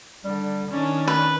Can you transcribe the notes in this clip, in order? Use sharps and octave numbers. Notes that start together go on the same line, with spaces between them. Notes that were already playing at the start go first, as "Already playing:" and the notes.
D3 G3
D#3 C#4 D4 D5
B4